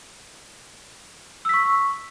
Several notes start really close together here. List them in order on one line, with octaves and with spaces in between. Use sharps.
E6 B6 C#6